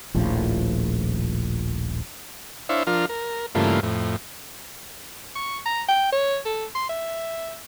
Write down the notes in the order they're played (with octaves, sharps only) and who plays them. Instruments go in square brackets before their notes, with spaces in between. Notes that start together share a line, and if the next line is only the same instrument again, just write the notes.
[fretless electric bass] D#1 A#1 A2 F3
[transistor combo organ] D4 E4 C5 C#5 E5 F5
F3 D4 F4 A#4 F6
A#4
G2 C#3 E3 A3 A#3 F4
F2 A2
[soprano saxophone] C#6
A#5
G5
C#5
A4
C6
E5